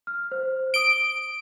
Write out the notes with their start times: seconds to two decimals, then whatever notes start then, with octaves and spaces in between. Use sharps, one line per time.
0.07 F6
0.32 C5
0.74 D#6 D7 G7